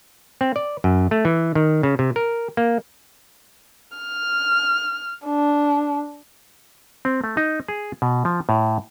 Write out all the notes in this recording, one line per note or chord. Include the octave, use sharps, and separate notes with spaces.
C4
D5
F#2
A3
E3
D#3
C#3
C3
A#4
A#3
F6
D4
C4
A3
D#4
G#4
B2
F3
A2